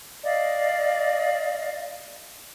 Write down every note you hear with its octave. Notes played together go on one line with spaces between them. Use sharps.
D5 D#5 F5